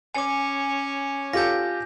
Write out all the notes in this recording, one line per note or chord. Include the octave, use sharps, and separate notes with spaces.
C#4 C#5 G#5 D6
F4 G4 A4 G6 A#6